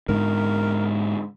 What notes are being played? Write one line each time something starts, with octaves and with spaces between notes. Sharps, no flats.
G#2 D3 A#4